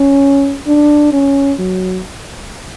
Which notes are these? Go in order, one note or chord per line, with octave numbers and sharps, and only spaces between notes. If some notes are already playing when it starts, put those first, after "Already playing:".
Already playing: C#4
D4
C#4
F#3